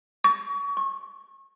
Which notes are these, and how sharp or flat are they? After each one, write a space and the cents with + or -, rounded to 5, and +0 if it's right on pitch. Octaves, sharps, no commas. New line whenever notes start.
C#6 +35
C#6 -30